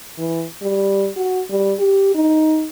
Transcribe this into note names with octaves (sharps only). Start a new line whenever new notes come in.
E3
G3
F#4
G3
G4
D#4